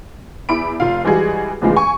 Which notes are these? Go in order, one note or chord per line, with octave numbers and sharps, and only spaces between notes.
E2 E4 B5 D7
F1 F4 F5
E3 G3 G#3 F#4 G#4
E2 A2 C#3 E3 F3 G#3
G#5 C#6